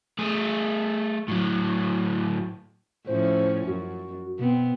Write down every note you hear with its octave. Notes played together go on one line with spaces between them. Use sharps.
A3 G#4
A2 F#3
A2 F3 C#4 C5
F#2 F#4
B2 B3 C4